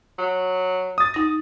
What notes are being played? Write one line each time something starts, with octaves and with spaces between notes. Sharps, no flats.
F#3
D#6 A6
D#4 A#6